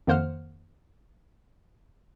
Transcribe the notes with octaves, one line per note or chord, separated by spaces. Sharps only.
F2 D#3 A#3 C5 F#5 F6